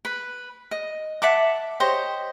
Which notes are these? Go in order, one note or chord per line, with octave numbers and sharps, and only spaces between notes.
B4 B5
D#5
E5 F#5 A5 D6
G4 C5 C#5 D#5